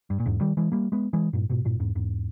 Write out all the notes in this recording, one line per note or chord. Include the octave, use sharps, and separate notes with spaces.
G2
A#2
E2 G#2
D#3 G3
E3 G#3
G3 A#3
G#3 B3
E3 G#3
G2 A#2
G#2 B2
G2 A#2
E2 G#2
E2 G#2